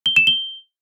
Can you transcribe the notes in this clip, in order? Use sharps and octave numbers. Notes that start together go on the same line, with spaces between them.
G7
E7
G7